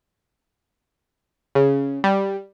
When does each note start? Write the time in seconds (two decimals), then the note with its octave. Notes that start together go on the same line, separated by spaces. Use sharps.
1.55 C#3
2.04 G3